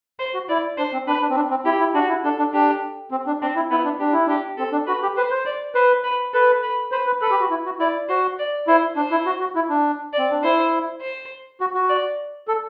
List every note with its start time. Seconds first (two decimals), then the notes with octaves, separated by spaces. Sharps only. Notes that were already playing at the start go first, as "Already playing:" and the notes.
0.19 C5
0.34 F#4
0.49 E4 D5
0.78 D4 C5
0.93 C4
1.07 D4 B4
1.22 D4
1.30 C4
1.36 D4
1.50 C4
1.65 E4 G4
1.79 E4
1.94 D4 F#4
2.09 E4
2.24 D4 A4
2.38 D4
2.53 D4 G4
3.11 C4
3.27 D4
3.42 C4 D4
3.56 E4
3.70 B3 E4
3.84 D4
4.00 D4 G4
4.13 E4
4.26 D4 G4
4.57 C4 A4
4.72 D4
4.87 F#4 B4
5.02 G4
5.17 B4 C5
5.31 C5
5.46 D5
5.75 B4 C5
6.04 B4
6.33 A4 B4
6.63 B4
6.92 B4 C5
7.07 B4
7.22 A4 B4
7.31 G4
7.41 F#4
7.50 E4
7.65 F#4
7.79 E4 D5
8.09 F#4 C5
8.39 D5
8.67 E4 C5
8.96 D4 C5
9.11 E4
9.26 F#4
9.40 F#4
9.55 E4
9.69 D4
10.13 D5
10.18 C4
10.31 D4
10.44 E4 C5
11.01 C5
11.61 F#4
11.75 F#4
11.89 D5
12.48 A4